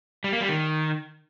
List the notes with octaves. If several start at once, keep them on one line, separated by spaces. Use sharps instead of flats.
G3
A#3
G3
D#3